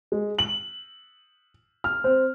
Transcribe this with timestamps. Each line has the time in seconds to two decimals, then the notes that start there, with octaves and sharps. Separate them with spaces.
0.12 G#3
0.39 F#7
1.84 F6
2.04 C4